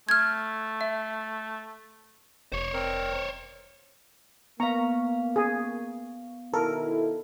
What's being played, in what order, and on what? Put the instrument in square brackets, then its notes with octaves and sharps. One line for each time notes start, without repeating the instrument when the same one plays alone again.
[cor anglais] A3 [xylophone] F6 G#6
[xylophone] E5
[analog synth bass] F1 [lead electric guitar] C5 C#5
[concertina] C4 A#4
[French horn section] A#3 [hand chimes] B3 F5 [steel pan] A#5 [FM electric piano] C#6
[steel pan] G#4
[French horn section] B2 D#3 E4 [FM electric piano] A4 [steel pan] A#4